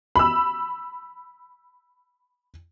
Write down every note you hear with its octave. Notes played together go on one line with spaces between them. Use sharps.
B5 E6